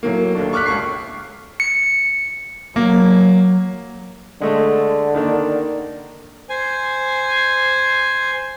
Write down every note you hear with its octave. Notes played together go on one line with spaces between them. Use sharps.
A2 E3 F#3 A#3
D#2 A3 D4
C#6 D6 F6 F#6 B6
C#2 A4 C#6 C7
C#7
F#3 A#3
D3 G#3 A3 A4
D#3 A#3 D4
C5 G#5